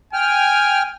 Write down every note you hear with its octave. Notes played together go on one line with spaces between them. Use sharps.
G5 G#5 F6